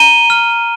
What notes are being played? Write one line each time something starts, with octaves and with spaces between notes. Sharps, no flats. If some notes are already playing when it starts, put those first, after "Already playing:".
Already playing: A#5 D#7 G7
F6